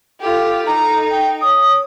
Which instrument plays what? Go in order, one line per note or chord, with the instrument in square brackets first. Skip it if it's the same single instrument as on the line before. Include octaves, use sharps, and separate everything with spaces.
[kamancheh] F4 G4 [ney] A4
[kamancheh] D#4 [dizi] A#5
[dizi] G5
[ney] C#5 [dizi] D#6